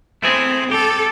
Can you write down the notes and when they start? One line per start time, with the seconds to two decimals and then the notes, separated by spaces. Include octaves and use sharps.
0.22 A3 C4 E4 G#4
0.71 G4 A4